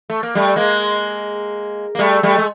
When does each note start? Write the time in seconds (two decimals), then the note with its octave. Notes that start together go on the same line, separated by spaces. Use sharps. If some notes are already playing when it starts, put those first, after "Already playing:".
0.10 A3
0.23 A#3
0.35 G3 A3
0.56 G#3 A#3
1.95 A#3
1.99 G3 A3
2.23 G3 A3
2.38 G#3